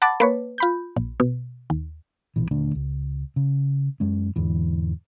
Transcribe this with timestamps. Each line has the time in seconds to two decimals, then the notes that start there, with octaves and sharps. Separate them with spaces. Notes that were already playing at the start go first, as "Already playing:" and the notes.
0.02 F#5 A5 B5 D6 A6
0.20 A#3 B4 C#5
0.58 F4 B5 G6
0.96 A#1
1.20 B2
1.70 D#2
2.36 A#1 B2 E3
2.51 D#1 D3 A3 D4
2.75 C#2
3.36 C#3
4.00 F#2 G#3 C#4
4.36 E2 G#2 D3 E3